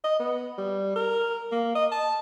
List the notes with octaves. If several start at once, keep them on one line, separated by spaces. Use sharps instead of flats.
D#5
B3
G3
A#4
A#3
D#5
A5